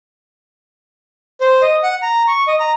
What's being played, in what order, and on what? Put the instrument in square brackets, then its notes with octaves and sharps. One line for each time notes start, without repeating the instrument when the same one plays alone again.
[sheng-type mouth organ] C5
D#5
F#5
A#5
C#6
D#5
A#5